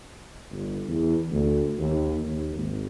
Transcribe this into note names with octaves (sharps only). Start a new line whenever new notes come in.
G1
E2
D2
D#2
D#2
G#1